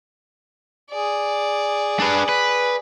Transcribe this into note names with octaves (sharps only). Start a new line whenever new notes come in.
G#4 D5
D4 B4
B4